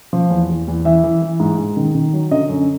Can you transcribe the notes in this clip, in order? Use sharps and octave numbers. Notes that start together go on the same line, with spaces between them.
F3
E2
E2
E2
E3 E5
E3
E3
G#2
G#2
D#3
D#3
F#3
D3 D#5
F#2